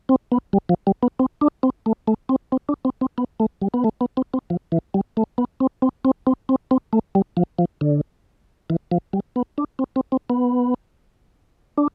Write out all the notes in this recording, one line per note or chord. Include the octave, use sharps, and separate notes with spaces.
C4
B3
G3
F3
G3
B3
C4
D4
C4
A3
A3
C4
C4
D4
C4
C4
B3
A3
G3
B3
A3
B3
C4
C4
F3
E3
G3
A3
B3
C4
C4
C4
C4
C4
C4
A3
G3
F3
F3
D3
E3
F3
G3
B3
D4
C4
C4
C4
B3
D4